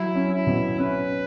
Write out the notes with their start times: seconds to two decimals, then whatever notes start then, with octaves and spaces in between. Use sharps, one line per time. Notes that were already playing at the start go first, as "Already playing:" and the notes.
Already playing: F#3 E4
0.15 C#4
0.31 E4
0.47 B2
0.78 C#4 B4